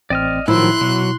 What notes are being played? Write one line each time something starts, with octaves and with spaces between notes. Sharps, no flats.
A1 C4 D5 D#5 F6
A2 D#3 F3 F#3 E4 C6 F#6
B2 F#3